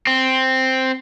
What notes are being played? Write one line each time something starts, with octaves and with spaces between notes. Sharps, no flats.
C4